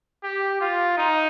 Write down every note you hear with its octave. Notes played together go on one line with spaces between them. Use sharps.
G4
F4
D#4